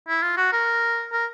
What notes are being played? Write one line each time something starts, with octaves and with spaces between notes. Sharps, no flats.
E4
F4
F#4
A#4
A#4